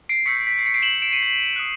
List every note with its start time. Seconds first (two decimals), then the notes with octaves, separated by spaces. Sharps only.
0.09 C7 D7
0.26 C#6 E6 G6 B6 C#7
0.37 C7
0.47 B6
0.59 C7
0.66 B6 C#7
0.74 C7 D7
0.82 E7 F#7
1.02 D7 E7
1.12 C#7 D#7
1.23 C7
1.56 D#6 F#6